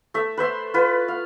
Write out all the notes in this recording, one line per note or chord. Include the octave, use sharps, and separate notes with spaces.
A3 E5
B4 C5 E5 C6
F4 B4
F5